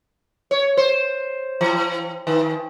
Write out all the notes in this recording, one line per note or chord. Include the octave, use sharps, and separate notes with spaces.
C#5
C5
E3
D#3